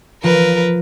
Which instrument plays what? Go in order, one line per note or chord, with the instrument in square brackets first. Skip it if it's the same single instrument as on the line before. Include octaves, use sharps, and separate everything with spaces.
[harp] F3 [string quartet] A#4 B4